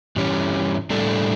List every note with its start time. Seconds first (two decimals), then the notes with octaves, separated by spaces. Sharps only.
0.16 G2 E3 G3 C#4
0.90 A2 G3 D4 A4